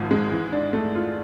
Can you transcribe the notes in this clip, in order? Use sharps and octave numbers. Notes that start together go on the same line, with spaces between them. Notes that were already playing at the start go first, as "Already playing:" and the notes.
Already playing: G#1 G#2 F3
G#3
E3
D4
A3
F4